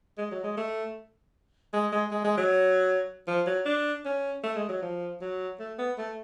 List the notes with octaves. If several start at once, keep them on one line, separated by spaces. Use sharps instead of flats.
G#3
F#3
G#3
A3
G#3
G#3
G#3
G#3
F#3
F3
F#3
D4
C#4
A3
G#3
F#3
F3
F#3
A3
B3
A3